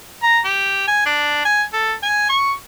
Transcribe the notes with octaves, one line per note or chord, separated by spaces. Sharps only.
A#5
G4
G#5
D4
G#5
A4
G#5
C#6